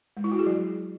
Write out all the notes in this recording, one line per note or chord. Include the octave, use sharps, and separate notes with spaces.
G#3
E4
F#4
G#4
F#3